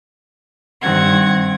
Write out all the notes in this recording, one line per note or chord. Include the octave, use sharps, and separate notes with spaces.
G2 D#3 G3 C4 F#5 G#6